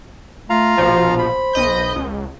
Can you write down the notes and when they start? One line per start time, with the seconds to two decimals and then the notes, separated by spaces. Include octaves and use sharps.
0.50 A3 F4 F5 A#5
0.78 A#1 B2 F3 C5
1.18 B5
1.53 B1 D#5 G6
1.96 C#2